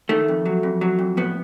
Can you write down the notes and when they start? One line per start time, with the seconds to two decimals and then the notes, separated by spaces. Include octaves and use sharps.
0.09 D#3 A3
0.28 F2
0.46 F#3
0.63 F2
0.81 F#3
0.99 F2
1.17 A2 B3